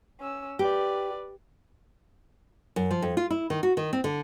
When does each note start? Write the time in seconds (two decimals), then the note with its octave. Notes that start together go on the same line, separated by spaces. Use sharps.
0.21 C#4 E6
0.59 G4 B4 D5
2.76 F#2
2.91 F3
3.02 F2
3.17 F4
3.30 E4
3.50 D#3
3.63 F#4
3.77 D#3
3.93 C4
4.04 D3